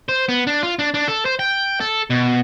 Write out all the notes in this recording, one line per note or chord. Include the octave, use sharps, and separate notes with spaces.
C5
B3
D4
F4
D4
D4
A4
C5
G5
A4
B2